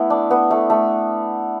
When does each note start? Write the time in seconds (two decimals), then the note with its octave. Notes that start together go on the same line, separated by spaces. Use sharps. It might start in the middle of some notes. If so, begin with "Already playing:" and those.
Already playing: A3 B3 E4
0.10 D4
0.31 B3
0.51 A3
0.70 A3